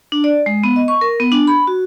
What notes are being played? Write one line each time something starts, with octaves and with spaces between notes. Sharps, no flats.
D4
D5
G#3
B3
D#5
C#6
A#4
B3
D4
B5
F#4